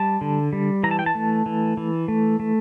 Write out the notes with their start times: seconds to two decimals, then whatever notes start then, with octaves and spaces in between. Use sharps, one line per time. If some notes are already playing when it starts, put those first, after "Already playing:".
Already playing: G3 A5
0.21 D3
0.53 G3
0.83 E3 A#5
0.91 A5
0.99 G5
1.06 A5
1.15 A3
1.46 E3
1.77 E3
2.08 A3
2.40 A3